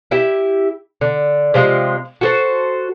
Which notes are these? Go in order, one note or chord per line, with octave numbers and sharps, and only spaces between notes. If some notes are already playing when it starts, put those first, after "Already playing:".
E4 G4 E5
D3
C3 F3 G#3
F#4 A4 C5